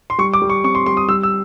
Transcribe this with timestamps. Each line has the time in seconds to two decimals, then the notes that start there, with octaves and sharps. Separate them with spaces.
0.10 C6
0.18 G3 C#6
0.33 D6
0.42 G3
0.49 C#6
0.64 C4 C#6
0.75 C6
0.86 G3 C6
0.97 D#6
1.08 G3 E6
1.23 E6